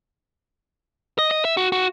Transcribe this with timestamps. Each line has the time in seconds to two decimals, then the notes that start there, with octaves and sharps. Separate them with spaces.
1.19 D#5
1.31 D#5
1.45 E5
1.57 F#4
1.72 F#4